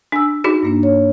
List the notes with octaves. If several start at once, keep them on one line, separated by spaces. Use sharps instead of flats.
D4 G#5 E6
D#4 F#4 G#4
G2 A#3 D4
C#5